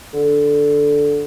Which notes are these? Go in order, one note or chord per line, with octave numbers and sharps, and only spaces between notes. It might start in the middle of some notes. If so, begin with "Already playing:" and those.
D3